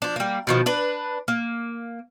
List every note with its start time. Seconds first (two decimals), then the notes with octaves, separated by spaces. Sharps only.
0.02 F3 D4
0.16 G3 A#3
0.47 B2 D#3 F3
0.66 D4 B4
1.28 A#3